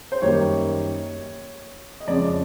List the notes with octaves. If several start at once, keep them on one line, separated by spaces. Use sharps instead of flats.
C5
F#2 D#3 G3 A#3 D#4 C#5
D#5
F2 C#3 F3 G#3 C#4 D5